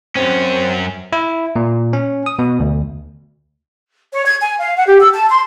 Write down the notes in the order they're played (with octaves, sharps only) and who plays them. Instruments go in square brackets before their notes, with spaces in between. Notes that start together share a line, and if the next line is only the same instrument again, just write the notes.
[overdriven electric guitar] F#2 C#4 [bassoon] C4
[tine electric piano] E4
A#2
C#4
D#6
B2
D2
[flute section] C#5
G#6
G#5
F5
F#5
G4
E6
A5
C6